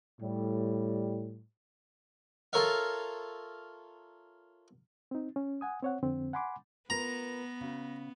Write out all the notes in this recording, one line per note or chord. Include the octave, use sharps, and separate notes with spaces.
A2 G3
F4 A4 A#4 C#5 E5 F5
C4 D#4
C#4
F#5 G#5 D#6
C4 C#5 F#5
F2 D3 C4
F#5 G#5 B5 C6 D6
B3 F4 A#4 B4 A#5
C#3 F#4